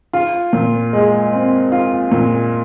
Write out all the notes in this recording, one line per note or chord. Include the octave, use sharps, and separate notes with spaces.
F4
A#2
G#3
C4
F4
A#2